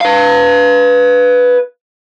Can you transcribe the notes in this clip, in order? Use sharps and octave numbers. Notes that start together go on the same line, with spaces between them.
B4 F5